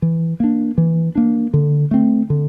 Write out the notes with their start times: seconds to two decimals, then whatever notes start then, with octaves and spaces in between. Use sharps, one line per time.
0.02 E3
0.40 A#3 D4
0.78 E3
1.15 A#3 D4
1.54 D3
1.91 A3 C4
2.30 D3